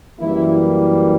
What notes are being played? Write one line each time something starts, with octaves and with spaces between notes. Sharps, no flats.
F#2 E3 G3 A#3 E4